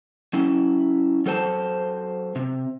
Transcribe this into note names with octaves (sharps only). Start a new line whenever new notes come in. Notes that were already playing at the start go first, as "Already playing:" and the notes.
F#3 C#4 E4
F#3 A4 C5 G#5 A5
C3